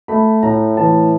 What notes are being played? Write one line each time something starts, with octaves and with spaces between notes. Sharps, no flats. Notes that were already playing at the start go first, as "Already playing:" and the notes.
A3 B5
A2 A#5
E3 A5